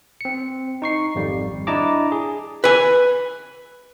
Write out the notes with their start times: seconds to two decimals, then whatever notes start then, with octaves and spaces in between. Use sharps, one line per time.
0.21 C4 C#7
0.82 D#4 C#6 C7
1.15 G#1 F2 G3
1.67 D4 E4 D#5 A5 A#5 D6
2.12 G#4
2.64 B4 G#5